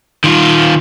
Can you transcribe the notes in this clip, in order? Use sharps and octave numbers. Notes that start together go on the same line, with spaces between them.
D#3 F4